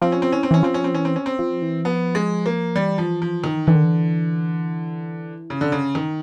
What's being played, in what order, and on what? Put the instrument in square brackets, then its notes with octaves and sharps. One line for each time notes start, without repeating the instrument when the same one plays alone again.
[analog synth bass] F3 [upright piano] C4
[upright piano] C#4
C4
[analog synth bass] E3 [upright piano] C#4
[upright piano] C4
[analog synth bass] E3 [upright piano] C#4
[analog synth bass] F3 [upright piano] C4
[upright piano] C#4
C4
[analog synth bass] E3 [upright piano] C#4
[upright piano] C4
C#4
C4
[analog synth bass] F3
E3
[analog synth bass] F3 [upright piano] B3
[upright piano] G#3
A#3
[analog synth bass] E3 [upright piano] G3
[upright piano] F3
F3
D#3
[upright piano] D3 [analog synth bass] E3
[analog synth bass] D#3
E3
[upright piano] C#3
D3
C#3
D#3